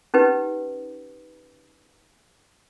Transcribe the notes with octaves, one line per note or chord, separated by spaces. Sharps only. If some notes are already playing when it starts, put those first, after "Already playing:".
C#4 D#4 G4 B4